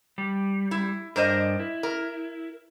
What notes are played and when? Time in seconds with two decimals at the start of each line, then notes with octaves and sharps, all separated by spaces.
0.18 G3
0.71 E4
1.16 G2 D4 A#4 C5 D#5
1.59 E4
1.83 A#4